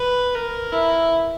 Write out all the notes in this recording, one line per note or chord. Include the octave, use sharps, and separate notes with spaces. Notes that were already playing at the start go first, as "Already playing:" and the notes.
Already playing: B4
A#4
E4